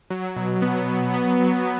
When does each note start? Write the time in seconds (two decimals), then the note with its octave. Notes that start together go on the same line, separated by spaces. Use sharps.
0.10 F#3
0.36 B2
0.62 B3
0.87 F#3
1.14 B3
1.40 F#3